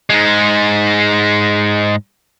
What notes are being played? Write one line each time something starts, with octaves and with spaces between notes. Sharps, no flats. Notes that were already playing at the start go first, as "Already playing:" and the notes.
G#2 G#3